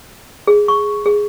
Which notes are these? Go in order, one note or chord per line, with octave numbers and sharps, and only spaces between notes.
G#4
C#6
G#4